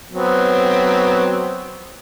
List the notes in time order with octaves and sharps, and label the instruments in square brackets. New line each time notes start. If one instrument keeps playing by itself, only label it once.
[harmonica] F#3 B3 C4